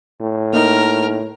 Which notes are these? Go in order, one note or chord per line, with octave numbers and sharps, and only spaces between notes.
A2
A#3 D#4 A#4 F6